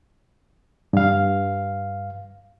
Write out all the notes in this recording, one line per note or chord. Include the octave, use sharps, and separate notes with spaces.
G2 F5